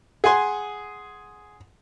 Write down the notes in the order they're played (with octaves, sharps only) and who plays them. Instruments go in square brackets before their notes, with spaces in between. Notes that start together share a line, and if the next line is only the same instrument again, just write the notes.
[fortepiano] G#4 F#5 G#5 C6